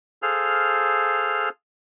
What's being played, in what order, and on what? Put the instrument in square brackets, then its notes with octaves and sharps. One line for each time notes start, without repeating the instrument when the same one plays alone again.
[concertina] G#4 A4 C5 F5 F6